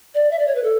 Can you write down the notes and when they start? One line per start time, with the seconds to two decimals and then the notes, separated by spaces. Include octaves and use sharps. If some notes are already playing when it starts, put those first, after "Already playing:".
0.15 D5
0.31 E5
0.39 D5
0.47 C#5
0.55 B4
0.64 A4